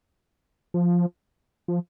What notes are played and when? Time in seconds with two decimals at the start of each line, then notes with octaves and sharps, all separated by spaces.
0.74 F3
1.68 F3